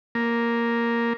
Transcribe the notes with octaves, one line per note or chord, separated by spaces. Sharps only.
A#3